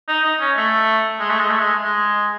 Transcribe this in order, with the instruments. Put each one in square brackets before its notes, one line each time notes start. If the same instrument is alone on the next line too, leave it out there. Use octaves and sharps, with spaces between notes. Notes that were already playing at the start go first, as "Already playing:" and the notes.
[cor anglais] D#4
D#4
C#4
A3
G#3
A3
G#3
A3
G#3
G#3